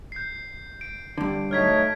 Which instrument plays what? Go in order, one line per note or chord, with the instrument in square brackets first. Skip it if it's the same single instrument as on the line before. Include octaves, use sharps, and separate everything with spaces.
[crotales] G6 C7
D7
[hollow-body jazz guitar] G2 D3
[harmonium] F#3 D#4 C#5 [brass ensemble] A3 [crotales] F6 G#6 B6